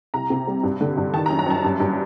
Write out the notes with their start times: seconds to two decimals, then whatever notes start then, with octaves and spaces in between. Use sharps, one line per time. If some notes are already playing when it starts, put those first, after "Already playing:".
0.14 C2 A#5
0.30 C3
0.47 G3
0.63 G2
0.81 D3
0.97 G2
1.13 D#3 A5
1.26 A#5
1.30 F#2
1.39 A#5
1.46 F#2 A5
1.64 G2
1.80 G2